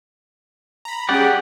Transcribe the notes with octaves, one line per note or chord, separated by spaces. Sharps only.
A#5 B5
G3 C#4 G4 G#4 D5 F#5